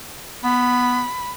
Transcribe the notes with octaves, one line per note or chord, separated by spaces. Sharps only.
B3 B5